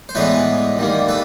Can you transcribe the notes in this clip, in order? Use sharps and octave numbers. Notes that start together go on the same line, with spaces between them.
C5
A2 E3 G#3 B3 D4 B4 C#5
D#2 D#3 G3 A#3
A4 B4